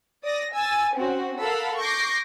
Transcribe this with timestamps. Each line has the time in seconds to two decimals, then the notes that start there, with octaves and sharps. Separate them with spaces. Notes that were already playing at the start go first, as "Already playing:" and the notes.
0.23 D5 D#6 A#6
0.52 G#5 E6 A6
0.95 C4 C#4 F#4
1.38 A4 A#4 F5 F#5 B5 E6
1.78 C#6 D6 G6 A#6 C7